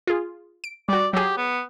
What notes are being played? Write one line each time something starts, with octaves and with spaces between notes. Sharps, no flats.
F4 G#4
D7
G3 F#4 D5
F#3 G4 G#4
B3